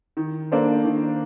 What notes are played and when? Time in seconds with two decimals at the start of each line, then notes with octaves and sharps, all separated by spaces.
0.17 D#3
0.52 A#3 D4 A4 C5
0.85 D#3